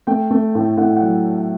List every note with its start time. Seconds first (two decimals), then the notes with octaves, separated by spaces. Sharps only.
0.07 A3 G5
0.31 A3
0.55 A2
0.77 A2 F#5
0.96 F#3 F#5